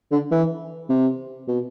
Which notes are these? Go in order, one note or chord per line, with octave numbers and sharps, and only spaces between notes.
D3
E3
C3
B2